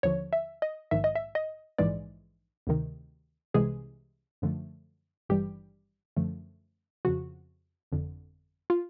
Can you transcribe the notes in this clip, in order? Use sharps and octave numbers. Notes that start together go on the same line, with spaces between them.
D#2 D3 F3 C#5
E5
D#5
A#1 G#2 D#3 E5
D#5
E5
D#5
A#1 G#2 E3 G#3 D5
D2 C3 D#3
C2 C3 E3 G#3 G#4
F#2 D3 F3 A3
G#1 G2 E3 G3 G4
F#2 D3 F3 A3
F2 C#3 F3 F#4
G1 F2 D3
F4